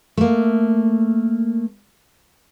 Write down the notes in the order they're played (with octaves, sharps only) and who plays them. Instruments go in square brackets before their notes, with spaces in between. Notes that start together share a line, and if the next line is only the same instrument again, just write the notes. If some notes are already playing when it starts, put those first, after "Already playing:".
[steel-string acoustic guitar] A3 A#3